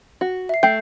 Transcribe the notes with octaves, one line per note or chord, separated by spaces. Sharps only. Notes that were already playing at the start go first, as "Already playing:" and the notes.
F#4
E5 C7
A3 G5 G6 C7